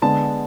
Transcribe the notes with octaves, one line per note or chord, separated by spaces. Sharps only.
D3 G#3 B3 D4 A5